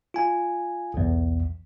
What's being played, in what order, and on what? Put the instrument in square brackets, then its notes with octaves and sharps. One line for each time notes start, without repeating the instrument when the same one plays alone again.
[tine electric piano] F4 G#5
B1 E2